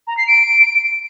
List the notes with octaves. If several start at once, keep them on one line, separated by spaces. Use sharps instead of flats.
A#5
C7
D7